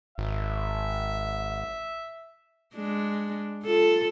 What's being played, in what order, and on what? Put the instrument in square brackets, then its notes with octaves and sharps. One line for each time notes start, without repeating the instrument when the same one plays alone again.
[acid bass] G#1 [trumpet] E5
[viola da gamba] G#3 D4
F4 A4